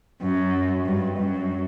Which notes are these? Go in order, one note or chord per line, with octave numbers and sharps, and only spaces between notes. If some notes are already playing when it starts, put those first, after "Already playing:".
F#2
G2
F#2